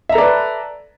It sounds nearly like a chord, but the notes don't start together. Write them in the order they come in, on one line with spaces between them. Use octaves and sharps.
E5 A#5 A4 D5 B4